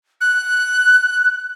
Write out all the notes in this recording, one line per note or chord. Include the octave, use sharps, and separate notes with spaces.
F#6